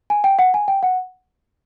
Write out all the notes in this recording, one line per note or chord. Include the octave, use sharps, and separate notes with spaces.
G#5
G5
F#5
G#5
G5
F#5